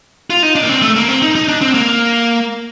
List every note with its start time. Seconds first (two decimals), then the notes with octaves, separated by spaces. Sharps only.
0.30 F4
0.43 D#4
0.55 D4
0.63 A#3
0.69 C4
0.82 A3
0.96 A#3
1.08 C4
1.22 D#4
1.35 D#4
1.48 D4
1.61 C4
1.74 A#3